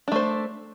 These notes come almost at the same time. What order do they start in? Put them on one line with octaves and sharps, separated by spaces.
D4 A3 C5